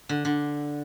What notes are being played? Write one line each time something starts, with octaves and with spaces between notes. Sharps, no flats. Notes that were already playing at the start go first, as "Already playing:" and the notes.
D3
D3